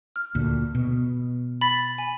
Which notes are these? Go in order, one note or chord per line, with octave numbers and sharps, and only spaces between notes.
F6
D2 A#2
B2
B5 A6 B6
G#5